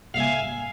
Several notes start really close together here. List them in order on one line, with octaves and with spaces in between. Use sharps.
F5 E5 G#5